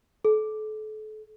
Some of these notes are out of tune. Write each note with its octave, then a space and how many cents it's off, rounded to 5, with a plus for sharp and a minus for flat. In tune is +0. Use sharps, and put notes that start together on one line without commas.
A4 -35